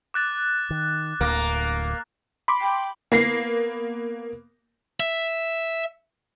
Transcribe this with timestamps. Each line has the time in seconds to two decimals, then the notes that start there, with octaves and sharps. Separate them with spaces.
0.14 D6 F#6 A6
0.70 D#3
1.21 D1 D2 A#3
2.48 B5 C6 D6
2.61 G5
3.12 A#3 B3 A#6 C7
5.00 E5